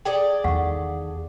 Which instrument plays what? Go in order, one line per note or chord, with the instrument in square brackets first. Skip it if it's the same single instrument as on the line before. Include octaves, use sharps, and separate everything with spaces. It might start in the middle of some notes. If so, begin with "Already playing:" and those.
[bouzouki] G#4 A4 D5 [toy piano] G5
[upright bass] E2 D#3 [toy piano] F5 F#5 C#6